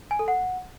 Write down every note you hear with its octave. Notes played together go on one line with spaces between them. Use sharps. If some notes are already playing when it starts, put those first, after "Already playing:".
G#5
A4
F#5